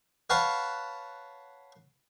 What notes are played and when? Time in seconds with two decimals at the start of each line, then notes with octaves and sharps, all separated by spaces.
0.30 B4 C#5 F5 F#5 A5